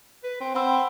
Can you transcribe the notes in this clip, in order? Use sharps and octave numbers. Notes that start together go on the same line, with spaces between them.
B4
C4
C4 F#5 B5 E6